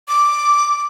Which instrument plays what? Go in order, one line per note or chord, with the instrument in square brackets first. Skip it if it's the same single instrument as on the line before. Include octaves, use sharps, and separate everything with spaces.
[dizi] D6